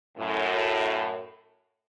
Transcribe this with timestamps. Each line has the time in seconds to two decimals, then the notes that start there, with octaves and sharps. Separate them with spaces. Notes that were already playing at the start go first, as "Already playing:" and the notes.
0.18 F#2 A2